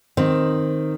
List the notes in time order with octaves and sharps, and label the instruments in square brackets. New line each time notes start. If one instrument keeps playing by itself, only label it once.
[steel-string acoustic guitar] D#3 [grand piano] C4